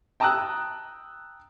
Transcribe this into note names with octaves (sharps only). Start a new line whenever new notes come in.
G5 A5 A#5 D#6 E6 F#6